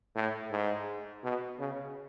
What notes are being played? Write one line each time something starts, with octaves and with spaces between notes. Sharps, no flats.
A2
G#2
B2
C#3